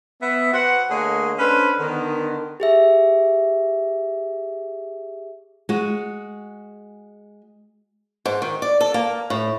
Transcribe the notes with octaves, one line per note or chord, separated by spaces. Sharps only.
B3 E5
F#4 B4 C5 F#5
D3 A3 A#3 G#4 C#5 D#5
C#4 D4 A4 B4 C5
D3 D#3 B3
G4 G#4 E5
G#3 F#4
G#2
D#3
D5
A4
A#3
A2